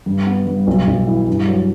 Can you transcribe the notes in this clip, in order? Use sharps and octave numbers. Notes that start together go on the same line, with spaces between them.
G2
B3
G2
B1
B1
E3
G2
F#3